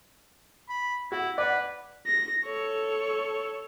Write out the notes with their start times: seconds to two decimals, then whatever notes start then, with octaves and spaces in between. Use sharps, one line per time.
0.69 B5
1.12 E4 F#4
1.38 B4 D5 F#5
2.06 A#6
2.45 A4 C#5